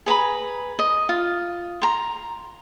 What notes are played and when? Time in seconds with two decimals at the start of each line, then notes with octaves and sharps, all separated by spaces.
0.06 G#4 B4 A#5 B5
0.79 D#5
1.09 F4
1.82 A#5 C6